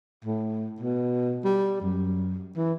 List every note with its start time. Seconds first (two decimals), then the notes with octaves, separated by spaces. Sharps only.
0.24 A2
0.80 B2
1.44 G3
1.81 F#2
2.56 E3